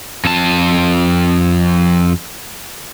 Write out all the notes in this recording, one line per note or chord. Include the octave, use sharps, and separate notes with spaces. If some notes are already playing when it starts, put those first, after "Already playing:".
F2 A5